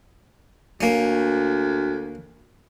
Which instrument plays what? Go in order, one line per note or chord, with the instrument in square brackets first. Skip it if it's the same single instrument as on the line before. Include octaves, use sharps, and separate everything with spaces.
[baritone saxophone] D2 [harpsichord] A#3 C#4